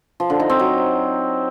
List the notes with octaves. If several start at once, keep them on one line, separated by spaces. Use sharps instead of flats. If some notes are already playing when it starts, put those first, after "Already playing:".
F3
D3
D#4
C4
F#3